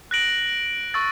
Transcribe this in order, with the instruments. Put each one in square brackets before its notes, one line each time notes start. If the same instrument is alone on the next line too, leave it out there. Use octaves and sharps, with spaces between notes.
[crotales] F#6 A#6 D7 F#7
C#6 E6 A6